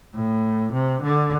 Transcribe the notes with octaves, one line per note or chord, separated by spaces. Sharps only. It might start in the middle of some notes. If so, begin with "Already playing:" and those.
A2
C3
D3